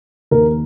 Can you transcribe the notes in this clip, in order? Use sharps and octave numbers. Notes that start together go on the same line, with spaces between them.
D#2 A#4